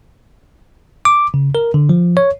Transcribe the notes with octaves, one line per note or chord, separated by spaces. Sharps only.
D6
C#3
A#4
D3
F3
C#5